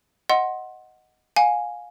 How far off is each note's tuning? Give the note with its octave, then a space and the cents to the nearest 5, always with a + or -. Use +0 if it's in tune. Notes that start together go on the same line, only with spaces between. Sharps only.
D#5 +5 F#5 +0 C6 +15
F5 +30 G#5 +0